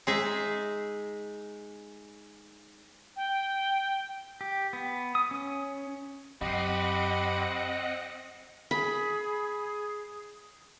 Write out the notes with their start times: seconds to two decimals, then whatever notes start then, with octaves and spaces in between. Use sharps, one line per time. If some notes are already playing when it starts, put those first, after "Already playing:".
0.07 G#3 D#4 G#4 E5
3.16 G5
4.41 G4
4.73 B3
5.15 D#6
5.31 C#4
6.41 F#2 C4 G4 D#5 F#5 B5
8.71 G#4 B5